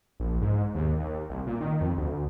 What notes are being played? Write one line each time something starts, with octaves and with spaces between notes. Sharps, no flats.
A#1
G#2
D#2
D#2
C2
A#2
D#3
F2
D2